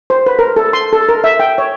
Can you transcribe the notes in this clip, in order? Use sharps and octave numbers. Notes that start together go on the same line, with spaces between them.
C5
B4
A#4
A4
C6
A4
A#4
E5
G5
C#5